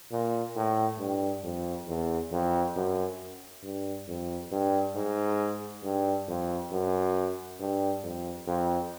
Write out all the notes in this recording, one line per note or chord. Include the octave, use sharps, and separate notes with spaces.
A#2
A2
G2
F2
E2
F2
F#2
G2
F2
G2
G#2
G2
F2
F#2
G2
F2
F2